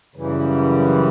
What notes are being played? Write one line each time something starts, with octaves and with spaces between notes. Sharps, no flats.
F#2 C#3 E3 G3